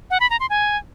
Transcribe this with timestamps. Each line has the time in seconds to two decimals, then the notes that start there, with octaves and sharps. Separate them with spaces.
0.10 F#5
0.20 B5
0.30 A#5
0.40 C6
0.50 G#5